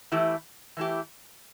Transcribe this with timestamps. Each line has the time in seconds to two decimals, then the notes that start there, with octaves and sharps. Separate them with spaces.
0.12 E3 A3 E4 G4
0.77 E3 A3 E4 G4